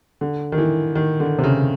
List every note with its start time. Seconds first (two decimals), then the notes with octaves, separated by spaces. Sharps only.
0.21 D3
0.52 D#3
0.58 E3
0.95 D#3
1.20 D3
1.39 C3
1.44 C#3